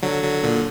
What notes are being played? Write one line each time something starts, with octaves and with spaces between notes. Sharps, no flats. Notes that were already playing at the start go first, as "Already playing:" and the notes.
D3 F#3
D3 F#3
A#2 D3